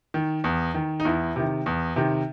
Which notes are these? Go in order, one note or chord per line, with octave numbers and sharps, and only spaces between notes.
D#3
E2
D#3
D#4
E2 E4
C3 D#3
E2
C3 D#3